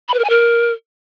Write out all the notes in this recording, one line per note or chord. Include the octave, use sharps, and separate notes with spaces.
B5
B4
A#4
G#5
A#4